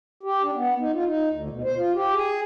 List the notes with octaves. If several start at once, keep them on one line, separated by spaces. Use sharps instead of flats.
G4
D4
B3
D#4
F4
D#4
D2
B2
C5
F4
G4
G#4